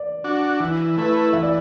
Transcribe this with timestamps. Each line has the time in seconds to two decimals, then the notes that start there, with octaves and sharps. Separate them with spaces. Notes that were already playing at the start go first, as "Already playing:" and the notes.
Already playing: D5
0.24 D4 F#4
0.60 E3
0.98 A3 E4 B4
1.33 E3 E5
1.43 D5